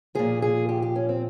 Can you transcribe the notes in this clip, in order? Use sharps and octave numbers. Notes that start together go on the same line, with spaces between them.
A#2 F3 G#4
G#4
G4
G4
C#4
C4